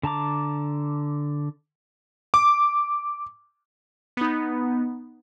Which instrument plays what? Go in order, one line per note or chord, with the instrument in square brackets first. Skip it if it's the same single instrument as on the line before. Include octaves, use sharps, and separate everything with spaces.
[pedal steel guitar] D3 A5 A#5 D6
[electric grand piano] D6
[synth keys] B3 D#4